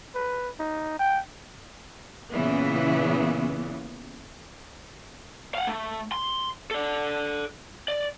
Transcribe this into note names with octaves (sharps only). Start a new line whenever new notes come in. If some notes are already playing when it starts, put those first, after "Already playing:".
B4
D#4
G5
A#2 C#3 E3 B3
F5 F#5
A3
C6
A4 D5
D5